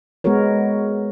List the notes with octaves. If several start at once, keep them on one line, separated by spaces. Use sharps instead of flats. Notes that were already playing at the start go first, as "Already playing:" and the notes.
G#3 B3 F#4 A#4 C#5